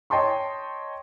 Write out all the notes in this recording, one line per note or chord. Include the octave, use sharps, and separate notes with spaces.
C#5 D#5 G5 A5 C6 C#6